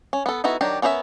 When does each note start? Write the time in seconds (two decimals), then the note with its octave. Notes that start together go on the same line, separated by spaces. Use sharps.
0.13 C#4
0.26 B3 A4
0.44 B3 D#4 E4 F#4 A4
0.61 D#3 F#3 D4 G4
0.82 B3 C#4 A#4 B4 E5